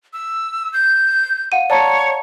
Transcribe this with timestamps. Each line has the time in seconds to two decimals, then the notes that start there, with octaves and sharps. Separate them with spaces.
0.13 E6
0.73 G6
1.52 F5 F#5 D#7
1.70 C#5 D5 A5 A#5